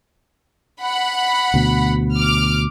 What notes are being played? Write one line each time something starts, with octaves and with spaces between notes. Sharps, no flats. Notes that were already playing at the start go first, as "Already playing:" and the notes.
F#5 B5
D2 B2
D6 F6